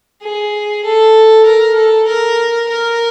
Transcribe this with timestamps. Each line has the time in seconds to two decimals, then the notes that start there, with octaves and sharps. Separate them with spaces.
0.23 G#4
0.85 A4
1.45 A#4
1.76 A4
2.07 A#4
2.69 A#4